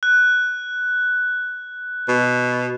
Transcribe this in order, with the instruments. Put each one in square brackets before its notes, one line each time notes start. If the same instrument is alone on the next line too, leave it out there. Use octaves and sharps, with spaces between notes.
[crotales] F#6
[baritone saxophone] B2